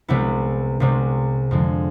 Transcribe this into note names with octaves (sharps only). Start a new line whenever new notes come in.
C2 C3 G#3 B3 E4
C2 C3 G#3
F2 D3 G#3